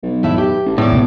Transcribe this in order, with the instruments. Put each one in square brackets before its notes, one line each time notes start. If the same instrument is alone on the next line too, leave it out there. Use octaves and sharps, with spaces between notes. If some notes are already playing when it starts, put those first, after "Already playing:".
[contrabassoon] B1
[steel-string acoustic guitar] A2 E4 E5
G4
[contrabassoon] A1
[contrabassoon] E2 [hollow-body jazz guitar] A2 [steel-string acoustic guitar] C#4 D5
[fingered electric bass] D2 C3 B3